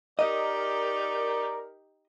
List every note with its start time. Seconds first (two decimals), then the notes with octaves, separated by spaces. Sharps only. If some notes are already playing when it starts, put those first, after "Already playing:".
0.19 D#4 G4 A#4 D5 D#5